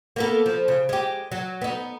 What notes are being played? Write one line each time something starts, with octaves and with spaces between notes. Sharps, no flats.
A#3 B3 A4
F3
C#3
G#3 G4
F#3
B3 D#4